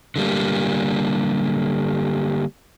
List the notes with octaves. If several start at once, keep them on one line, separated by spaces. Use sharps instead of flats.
D3 G3 A#3